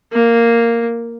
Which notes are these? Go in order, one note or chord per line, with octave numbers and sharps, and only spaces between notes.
A#3